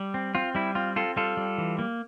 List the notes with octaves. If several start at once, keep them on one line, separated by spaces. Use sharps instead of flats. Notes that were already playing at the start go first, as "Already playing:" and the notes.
Already playing: G3
C4
C4 F4
G3 E4
C4 F4
C4 F4 A4
G3 F4 A4
G3
E3
A#3